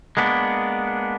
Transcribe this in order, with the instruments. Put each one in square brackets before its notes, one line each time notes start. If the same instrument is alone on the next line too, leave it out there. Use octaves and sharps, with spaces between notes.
[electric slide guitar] G#3 A#3 B3 D4